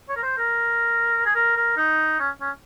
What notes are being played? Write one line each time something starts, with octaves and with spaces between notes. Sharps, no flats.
C#5
A#4
C5
A#4
G#4
A#4
A#4
D#4
C#4
C#4